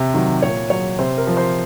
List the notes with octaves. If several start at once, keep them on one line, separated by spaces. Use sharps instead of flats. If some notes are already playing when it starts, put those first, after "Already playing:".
Already playing: C3
D#3 F#3
A#2 C#5
F#3 C#5
C3 C5
A#4
F3
C5